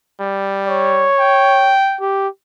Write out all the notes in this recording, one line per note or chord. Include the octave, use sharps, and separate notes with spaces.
G3
C#5
G5
G4